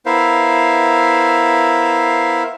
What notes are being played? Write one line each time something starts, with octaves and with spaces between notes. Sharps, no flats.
B3 E4 A#4 C5 E5 F5